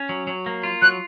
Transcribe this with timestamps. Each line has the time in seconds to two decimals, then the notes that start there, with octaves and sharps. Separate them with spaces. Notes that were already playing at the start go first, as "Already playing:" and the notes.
Already playing: C#4
0.09 F#3
0.27 F#3
0.46 A#3
0.63 F4
0.82 F#3 F#6